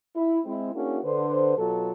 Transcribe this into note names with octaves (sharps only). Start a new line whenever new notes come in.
E4
G#3 C4 E4
A#3 C#4 D4 E4 F#4 G#4
D3 B4 C5
B2 F#3 F4 A4